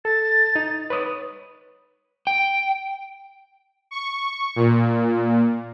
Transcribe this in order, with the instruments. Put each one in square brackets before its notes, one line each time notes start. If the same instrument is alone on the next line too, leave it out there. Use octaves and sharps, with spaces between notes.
[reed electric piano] A4 [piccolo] A6
[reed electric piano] D#4
B4 C#5 D#6
[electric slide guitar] G5
[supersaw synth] C#6
A#2